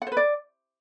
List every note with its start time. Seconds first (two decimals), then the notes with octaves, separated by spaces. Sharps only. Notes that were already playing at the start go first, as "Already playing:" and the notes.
0.02 F#5
0.07 C5
0.12 B4
0.17 D5